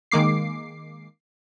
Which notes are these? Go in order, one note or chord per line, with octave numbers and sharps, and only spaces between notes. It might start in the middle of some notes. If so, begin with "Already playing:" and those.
D#3 G#3 A#3 D6 C7